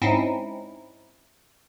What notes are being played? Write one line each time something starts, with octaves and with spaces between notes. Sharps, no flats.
G#2 C4 C#4 D#4 E4